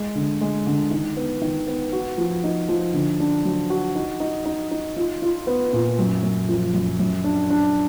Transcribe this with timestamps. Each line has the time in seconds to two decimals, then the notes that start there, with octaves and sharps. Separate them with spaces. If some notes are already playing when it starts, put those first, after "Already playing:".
Already playing: G#3
0.15 D3
0.41 G#3
0.67 D3
0.91 D#3
1.17 B3
1.42 D#3
1.67 B3
1.93 F#4
2.18 F3
2.44 D#4
2.69 F3
2.94 D3
3.20 D4
3.45 F#3
3.70 F#4
3.95 D#4
4.20 D#4
4.46 D#4
4.71 D#4
4.97 F4
5.22 F4
5.47 B3
5.73 A#2
5.99 F#2
6.23 F#2
6.49 F3
6.74 F#2
6.99 F#2
7.24 D4
7.50 D4